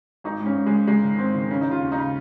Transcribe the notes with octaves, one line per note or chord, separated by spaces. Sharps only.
G#1 D#4
G#2
C#4
G#2
G#3
G#1
G#2 G#3
D#3
G#2 C4
D#3
C#3 C#4
C#3 D#4
F4
D#2
D#4
C#3